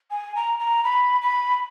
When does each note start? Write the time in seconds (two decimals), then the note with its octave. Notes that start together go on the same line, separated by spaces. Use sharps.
0.10 G#5
0.35 A#5
0.59 A#5
0.84 B5
1.21 B5